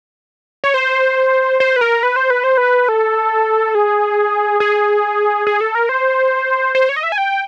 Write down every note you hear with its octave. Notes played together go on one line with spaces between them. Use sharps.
C#5
C5
C5
B4
A#4
B4
C5
B4
C5
B4
A4
G#4
G#4
G#4
A4
A#4
C5
C5
C#5
D#5
E5
G#5
G5